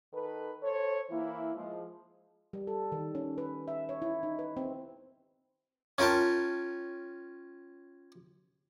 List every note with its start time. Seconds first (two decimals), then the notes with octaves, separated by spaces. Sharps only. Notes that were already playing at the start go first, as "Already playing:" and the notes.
0.13 D#3 A4 B4
0.62 A4 C5 C#5
1.10 E3 A#3 E4
1.55 F3 G#3
2.53 G3
2.67 A4
2.92 D#3
3.15 C#4
3.38 B4
3.68 E5
3.89 C#5
4.02 E4
4.23 D#4
4.39 B4
4.57 C4
5.98 C#4 F4 A#4 G5 A5